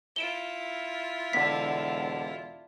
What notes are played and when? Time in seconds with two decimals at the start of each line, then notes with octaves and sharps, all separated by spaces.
0.16 E4 F4 D7 E7 G7
1.33 E1 D3 B6